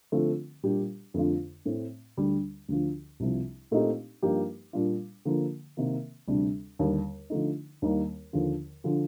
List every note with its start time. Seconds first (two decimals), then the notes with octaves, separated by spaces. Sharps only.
0.12 D3 F3 A3 C4 F4
0.63 A#2 G3 D4 G4
1.14 F2 D3 A3 D4 F4
1.66 A2 A3 C4
2.17 D2 D3 G3 D4
2.69 D2 D3 F3
3.20 C2 C3 F3
3.71 A#2 A3 C4 D#4 G4
4.22 G2 F3 A#3 D#4 G4
4.73 A#2 G3 D4 F4
5.25 D3 F3 A#3
5.77 C3 D#3 A#3
6.28 D2 C3 G3 D4
6.79 D#2 D3 G3
7.30 D3 F3 A3 D#4
7.82 D#2 D#3 G3 A#3
8.33 D#2 D3 F3
8.84 D3 F3